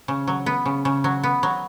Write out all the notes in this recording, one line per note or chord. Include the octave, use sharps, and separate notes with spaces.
C#3
F#3
B3
C#3
C#3
F#3
B3
F#3